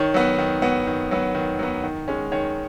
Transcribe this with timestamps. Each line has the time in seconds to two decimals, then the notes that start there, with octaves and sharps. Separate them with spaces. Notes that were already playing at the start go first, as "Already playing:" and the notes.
Already playing: D#3 C#5
0.14 F#3 B3
0.38 D#3
0.62 F#3 B3
0.87 D#3
1.11 F#3 B3
1.35 D#3
1.59 F#3 B3
1.83 D#3
2.08 G#3 C#4
2.32 D#3 C#5